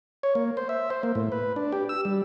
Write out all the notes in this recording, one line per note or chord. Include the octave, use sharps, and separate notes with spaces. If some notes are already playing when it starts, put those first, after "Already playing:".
C#5
A#3
C5
E5
C5
A#3
A2
B4
D4
G4
E6
G3